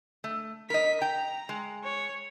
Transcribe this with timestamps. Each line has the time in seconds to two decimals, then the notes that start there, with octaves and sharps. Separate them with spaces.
0.24 A3
0.70 A#4 D#5 B6
1.02 G5 A#5
1.49 G#3
1.84 C#5